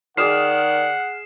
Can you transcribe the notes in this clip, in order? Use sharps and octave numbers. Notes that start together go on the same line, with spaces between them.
D#3 G#4 D5 F#5 D#6 F6 C7 E7